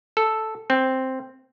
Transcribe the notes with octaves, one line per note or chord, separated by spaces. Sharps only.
A4
C4